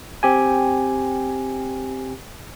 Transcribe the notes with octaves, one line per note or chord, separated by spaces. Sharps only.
C4 G4 G#5